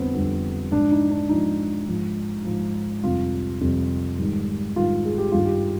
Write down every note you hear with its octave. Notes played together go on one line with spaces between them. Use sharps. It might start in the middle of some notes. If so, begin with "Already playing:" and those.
Already playing: F2 D3 G3 B3 C4
F2 D3 G3 B3
G#2 F3 D4
D#4
D4
G#2 F3 D#4
G#2 F3
G#2 F3
F2 C3 G3 F4
F2 C3 G3
G#2 D#3 G3
G#2 D#3 G3 F4
G#4
G4
G2 D#3 G3 F4
G4